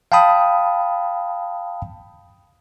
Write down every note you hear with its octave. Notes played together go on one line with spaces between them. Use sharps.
F5 G5 A5 B5 D#6